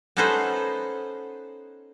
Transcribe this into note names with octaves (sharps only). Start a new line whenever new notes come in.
B3 C#4 D#4 A4 B4 C5